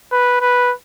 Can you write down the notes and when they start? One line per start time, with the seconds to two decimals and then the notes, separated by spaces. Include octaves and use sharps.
0.11 B4
0.41 B4